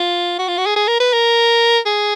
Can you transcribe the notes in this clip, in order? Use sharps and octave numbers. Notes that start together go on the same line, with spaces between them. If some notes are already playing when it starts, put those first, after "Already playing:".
Already playing: F4
F#4
F4
F#4
G#4
G#4
A#4
B4
A#4
G#4